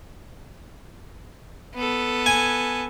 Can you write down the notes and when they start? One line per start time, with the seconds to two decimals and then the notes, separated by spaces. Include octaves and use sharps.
1.75 B3 A4
2.26 G#5